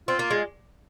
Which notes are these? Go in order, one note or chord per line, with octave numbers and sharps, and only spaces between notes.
C4 F4
A#3
G#3